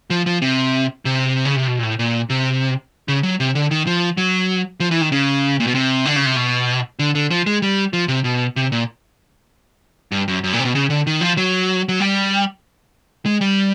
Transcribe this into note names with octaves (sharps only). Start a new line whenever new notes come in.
F3
F3
C3
C3
C#3
C3
B2
A#2
A2
A#2
C3
C#3
F#3
C3
D3
D#3
F3
F#3
F3
E3
D#3
C#3
A#2
B2
C3
D3
C#3
C3
B2
D3
D3
F3
G#3
G3
F3
C3
B2
C3
A#2
G2
F#2
F#2
A#2
C3
B2
C#3
D3
D#3
F3
F#3
F#3
G3
G#3
G3